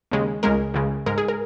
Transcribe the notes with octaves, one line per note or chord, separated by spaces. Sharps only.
D#2 C#3 G#3
C#2 C#3 G#3 A#4
C#2 C#3 G#3
G#2 G#3 A#4
G#4
A#4